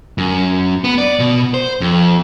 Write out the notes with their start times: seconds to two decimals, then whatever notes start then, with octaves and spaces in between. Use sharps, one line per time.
0.18 F#2
0.84 B3
0.98 D5
1.19 B2
1.54 C5
1.81 F2